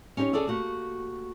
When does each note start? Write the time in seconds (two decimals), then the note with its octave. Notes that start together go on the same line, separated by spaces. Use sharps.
0.17 C#4 D#4 G4 C5 C#5
0.33 C#4 G#4 A4 D5 E5
0.47 A3 A#3 F#4 G4